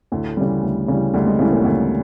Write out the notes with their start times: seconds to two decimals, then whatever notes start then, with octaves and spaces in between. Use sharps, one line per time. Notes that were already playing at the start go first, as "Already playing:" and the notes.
0.12 D2 A2 A3
0.37 C#3 E3 G3
0.63 D2
0.88 C#3 E3 G3
1.14 D2 G3
1.26 G#3
1.39 A2 C#3 E3 G3 A3
1.51 A#2 A#3
1.64 D2